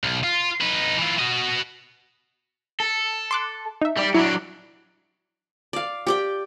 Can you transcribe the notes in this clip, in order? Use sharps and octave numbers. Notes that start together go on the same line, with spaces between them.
B1
F4
D#4 B4
E3 F4
F#4 D#5
A4
C6 D6 F#6
D#4 E5
G3 D5
F#3 D4 E4
D5 F5
G4 D5 G5